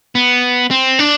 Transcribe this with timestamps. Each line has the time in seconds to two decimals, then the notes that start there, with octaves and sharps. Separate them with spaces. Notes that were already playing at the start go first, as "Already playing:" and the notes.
0.15 B3
0.71 C4
0.99 D4